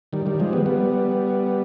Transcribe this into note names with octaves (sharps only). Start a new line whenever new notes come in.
D#3 G3
D#3 G3
F3 G#3
G3 B3
G3 B3